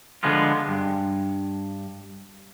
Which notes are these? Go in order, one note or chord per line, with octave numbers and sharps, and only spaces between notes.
D3 F3 G#3 B3 F4
G2